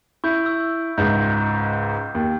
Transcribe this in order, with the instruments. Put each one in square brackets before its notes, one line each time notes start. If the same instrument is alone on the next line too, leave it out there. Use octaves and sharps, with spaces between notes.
[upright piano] E4 [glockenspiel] C#6 G6
[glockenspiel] C#6 E6 G6
[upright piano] C#2 G#2 [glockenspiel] G6
[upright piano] D#2